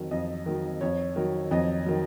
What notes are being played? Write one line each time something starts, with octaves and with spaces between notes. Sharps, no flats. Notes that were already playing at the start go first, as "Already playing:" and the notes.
Already playing: F2 D#3 F#3
F2 D#5
D#3 F#3
F2 C#5
D#3 F#3
F2 D#5
D#3 F#3